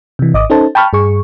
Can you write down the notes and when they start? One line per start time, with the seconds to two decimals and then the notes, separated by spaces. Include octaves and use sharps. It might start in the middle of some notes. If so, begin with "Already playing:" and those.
0.19 C3 E3
0.33 G#1 D#5 D6 D#6
0.50 C#4 D#4 A4 C5 A5
0.75 G5 A5 B5 C#6 F6
0.93 G2 G#4 C#6